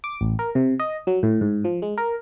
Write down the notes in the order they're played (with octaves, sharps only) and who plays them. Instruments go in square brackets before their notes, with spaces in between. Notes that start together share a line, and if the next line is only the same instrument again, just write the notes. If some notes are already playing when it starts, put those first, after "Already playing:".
[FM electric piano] D6
A1
A#4
C3
D#5
F#3
A2
G#2
F3
G#3
A#4